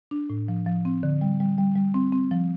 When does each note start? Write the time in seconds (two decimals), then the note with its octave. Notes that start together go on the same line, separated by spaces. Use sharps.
0.11 D4
0.30 A2
0.48 F3
0.66 F3
0.85 C4
1.03 D3
1.21 G3
1.40 G3
1.58 G3
1.76 G3
1.94 C4
2.12 C4
2.31 F3